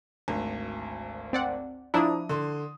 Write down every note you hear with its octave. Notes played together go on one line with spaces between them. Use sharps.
G#1 D2
C4 D5 F#5
F3 D4 E4 A#5 D#6
D3 C6